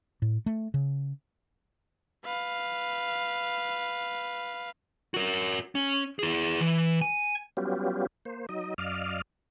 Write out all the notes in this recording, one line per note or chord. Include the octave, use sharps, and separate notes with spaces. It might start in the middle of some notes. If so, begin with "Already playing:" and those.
A2
A3
C#3
B4 F5
F#4 A#4
C#4
E4 G#4
E3
G#5
F#3 G3 B3 C#4 F4 G4
A#3 C5
F#3 D#4 D#5
F#2 D5 D#5 F5 F6